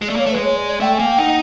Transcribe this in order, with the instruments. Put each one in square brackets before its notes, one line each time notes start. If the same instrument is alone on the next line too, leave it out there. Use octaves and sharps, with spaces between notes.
[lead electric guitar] G#3
[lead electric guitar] A3 [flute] D5
[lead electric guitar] A#3 [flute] C#5
[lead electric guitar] A3
[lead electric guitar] G#3 [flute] B4
[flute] C#5
D5
D5
[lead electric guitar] A3 [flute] G5
[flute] G#5
[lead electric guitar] A#3
[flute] G5
[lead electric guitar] D#4 [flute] F#5